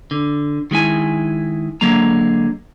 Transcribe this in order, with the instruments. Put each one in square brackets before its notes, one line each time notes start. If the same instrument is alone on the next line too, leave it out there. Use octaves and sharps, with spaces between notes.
[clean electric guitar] D3
D#3 G#3 E4 G#5
D3 F#3 G#3 A#3 A#5